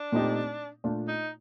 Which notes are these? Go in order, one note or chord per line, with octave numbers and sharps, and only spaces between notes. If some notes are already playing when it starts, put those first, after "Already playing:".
Already playing: D4
A#2 A3 C4 D#4 G4
A#2 A3 D4 F4
D#4